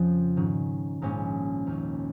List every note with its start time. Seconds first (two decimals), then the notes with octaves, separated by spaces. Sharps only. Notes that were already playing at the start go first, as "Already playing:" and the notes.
Already playing: F2 C#3 F3
0.37 G#2 D#3 C#4
1.02 A#1 G#2 G#3 C#4
1.67 D#2 D#3 C#4